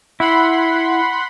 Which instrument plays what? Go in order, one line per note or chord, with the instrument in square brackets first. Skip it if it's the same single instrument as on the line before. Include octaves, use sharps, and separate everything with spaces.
[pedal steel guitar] E4 [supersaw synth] F#5 B5 C6